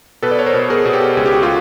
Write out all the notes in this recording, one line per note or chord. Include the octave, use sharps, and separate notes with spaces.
B2 A4 B4
D5
C#5
A#4 C5
B2
G#4 A#4
B2
G4 A4
C#2 G#4
G4
F#4
F4 G4